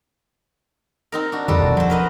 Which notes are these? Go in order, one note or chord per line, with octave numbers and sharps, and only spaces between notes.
C4 D#4 A#4
D4 F#4
F2 D#3 G3 F#4 A4
E1 E2 E3
F3 F#3 C5
A#4 B4 D#5